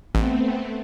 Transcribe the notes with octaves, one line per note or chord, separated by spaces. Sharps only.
A1 A3 B3 C4